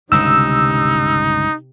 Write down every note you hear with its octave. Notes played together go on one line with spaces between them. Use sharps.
G1 C#2 G2 C3 D#4 E6